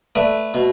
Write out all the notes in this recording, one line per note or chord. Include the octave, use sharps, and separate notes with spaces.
A3 B4 D5
B2